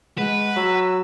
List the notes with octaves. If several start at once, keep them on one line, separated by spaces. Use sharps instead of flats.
G#3 B4 F#5
F#3 E6